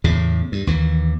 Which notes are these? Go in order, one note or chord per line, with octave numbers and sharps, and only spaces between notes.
E2 A2 C#3
G2
D#2 E3